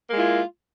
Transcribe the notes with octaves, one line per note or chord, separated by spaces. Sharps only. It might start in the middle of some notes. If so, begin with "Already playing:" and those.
G#3 A#3 E4 F4